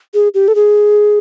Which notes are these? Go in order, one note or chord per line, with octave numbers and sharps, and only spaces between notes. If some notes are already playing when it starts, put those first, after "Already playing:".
G#4
G4
A4
G#4